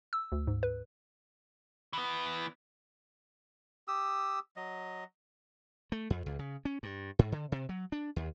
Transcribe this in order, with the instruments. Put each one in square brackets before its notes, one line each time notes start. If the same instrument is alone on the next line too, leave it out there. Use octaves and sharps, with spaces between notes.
[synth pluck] E6
D2
G#2
B4
[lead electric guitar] E3 B3
[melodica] G4 D#6 E6
F#3 D#5
[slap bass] A3
F2
C#2
C#3
C#4
G2
G#2
D3
C3
F#3
D4
D#2